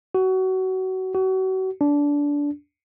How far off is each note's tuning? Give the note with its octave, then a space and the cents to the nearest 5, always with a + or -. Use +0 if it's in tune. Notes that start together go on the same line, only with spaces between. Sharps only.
F#4 +25
F#4 +35
D4 -20